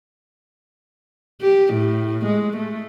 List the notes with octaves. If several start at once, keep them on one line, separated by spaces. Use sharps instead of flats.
G4
A2
G#3
A3